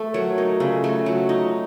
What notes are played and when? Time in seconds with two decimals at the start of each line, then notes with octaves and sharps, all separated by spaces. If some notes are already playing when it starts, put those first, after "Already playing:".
Already playing: A3
0.14 F#3 A#4 C#5
0.37 D#4 F#4 A#4
0.60 C#3 F4 A4
0.84 A3
0.89 F4
0.94 F#4
1.06 F#3
1.29 D#4 F4